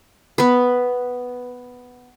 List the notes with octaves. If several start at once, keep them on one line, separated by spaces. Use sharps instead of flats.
B3 B4